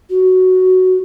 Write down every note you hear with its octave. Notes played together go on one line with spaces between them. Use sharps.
F#4